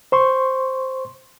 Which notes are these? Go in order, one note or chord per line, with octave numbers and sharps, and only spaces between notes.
C5 C6 C#6